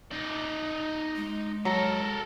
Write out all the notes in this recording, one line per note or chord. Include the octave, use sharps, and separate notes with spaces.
D#4 D5
G#3
F#3 A4 A#4 A#5